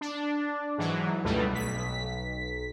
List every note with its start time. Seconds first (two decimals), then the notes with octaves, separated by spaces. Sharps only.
0.01 D4
0.78 G#2 E3 F#3
1.24 C#2 G2 B2 G3 A3
1.53 B1 B6